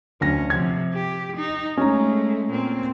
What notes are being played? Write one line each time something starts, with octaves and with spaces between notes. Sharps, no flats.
D2 F#3 C#4 A#6
C3 F3 G#6
G4
D#4
G#3 A3 C#4 C#5 A#5
A#2 C4